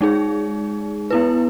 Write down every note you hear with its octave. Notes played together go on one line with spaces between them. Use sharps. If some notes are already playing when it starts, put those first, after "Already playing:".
G#3 D#4 G#4
B3 E4 B4